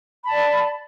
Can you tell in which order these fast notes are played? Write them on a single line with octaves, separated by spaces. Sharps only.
B5 A5 D5